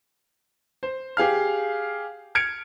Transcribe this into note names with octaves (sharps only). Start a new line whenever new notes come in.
C5
G4 G#4 F5 F6
F6 G#6 C#7 D7